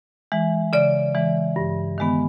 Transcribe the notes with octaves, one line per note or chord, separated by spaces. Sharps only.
E3 G#3
C#3 D5
E3 G#3
G2
D#3 G#3 B3